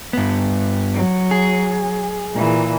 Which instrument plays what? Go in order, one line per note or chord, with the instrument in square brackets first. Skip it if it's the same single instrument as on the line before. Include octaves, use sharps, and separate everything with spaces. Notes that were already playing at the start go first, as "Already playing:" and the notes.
[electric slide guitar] G2 B3
[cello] F#3
[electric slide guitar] G#4
[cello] A#2 E3